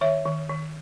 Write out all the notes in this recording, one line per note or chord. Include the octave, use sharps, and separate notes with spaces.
D#3 C#5 E5
D#3
D#3